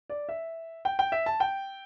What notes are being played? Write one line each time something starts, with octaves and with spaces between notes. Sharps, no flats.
D5
E5
G5
G5
E5
A5
G5